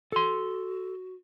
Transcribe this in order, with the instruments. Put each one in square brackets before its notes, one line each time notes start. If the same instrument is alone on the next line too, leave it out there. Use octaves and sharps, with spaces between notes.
[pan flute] F#4 [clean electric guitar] A4 C6